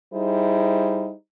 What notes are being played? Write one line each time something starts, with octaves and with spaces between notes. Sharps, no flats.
G3 D#4 E4 G#4 C5